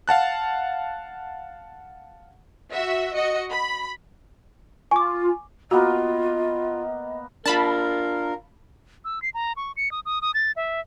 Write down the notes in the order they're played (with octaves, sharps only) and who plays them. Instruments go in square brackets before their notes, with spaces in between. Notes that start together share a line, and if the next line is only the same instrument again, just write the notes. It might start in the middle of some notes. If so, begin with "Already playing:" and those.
[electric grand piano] F5 F#5 A5 F#6
[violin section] F#4 E5
F#4 D#5 C#7
B5
[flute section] F4 [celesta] G#5 [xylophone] C#6 D6
[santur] A#3 B3 A#4 [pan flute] F4 [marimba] F#4 [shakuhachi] D#5
[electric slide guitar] D4 F4 [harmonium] A#4 [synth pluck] A5 B5
[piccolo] E6
C7
A#5
C#6
C#7
D#6
D#6
D#6
A6
E5